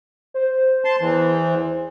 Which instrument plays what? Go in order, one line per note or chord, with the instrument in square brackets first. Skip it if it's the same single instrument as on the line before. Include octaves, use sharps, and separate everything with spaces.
[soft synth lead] C5
[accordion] A5 C6
E2 E3